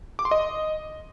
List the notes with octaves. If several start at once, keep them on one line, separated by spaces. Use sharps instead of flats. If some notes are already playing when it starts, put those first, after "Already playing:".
D6
C6
D#5